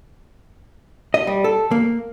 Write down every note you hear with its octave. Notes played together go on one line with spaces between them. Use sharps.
D#5
G3
A4
A#3